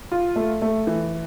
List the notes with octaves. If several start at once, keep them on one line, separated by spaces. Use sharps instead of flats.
F4
A3
A3
E3